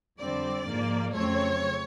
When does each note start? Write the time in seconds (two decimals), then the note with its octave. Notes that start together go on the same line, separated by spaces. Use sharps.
0.19 F2 D3 G3 C4 D5
0.68 G#2 F3 A#3
1.16 F2 C#3 F#3 A3 C4 C#5